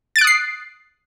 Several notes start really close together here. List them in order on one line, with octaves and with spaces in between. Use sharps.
A6 D7 F#6 D#6 C7